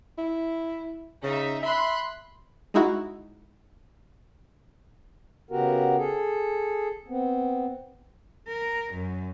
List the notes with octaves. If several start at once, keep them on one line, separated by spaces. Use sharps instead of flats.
E4
C#3 D#4 E5
E5 B5 C6 F#6
G#3 D#4 E4 F#4
C#3 B3 F#4 G4 A#4
G#4 A4
B3 C4
A#4
F#2